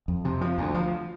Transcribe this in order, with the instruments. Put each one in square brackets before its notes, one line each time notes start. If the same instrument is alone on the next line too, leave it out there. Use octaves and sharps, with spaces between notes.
[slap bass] F2
C3
F3
D2
F3